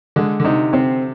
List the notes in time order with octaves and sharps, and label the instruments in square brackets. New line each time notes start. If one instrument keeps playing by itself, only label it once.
[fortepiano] D3 [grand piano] G#3
[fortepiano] D3
[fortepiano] C3 [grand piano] D#4
[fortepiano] C3 [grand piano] C4